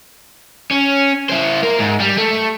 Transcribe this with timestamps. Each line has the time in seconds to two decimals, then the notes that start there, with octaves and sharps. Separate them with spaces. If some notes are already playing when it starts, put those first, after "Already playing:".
0.71 C#4
1.29 E4 C5
1.63 A#3 A#4
1.79 G#2
2.00 G3
2.17 A3